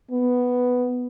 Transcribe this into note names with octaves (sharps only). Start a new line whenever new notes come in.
B3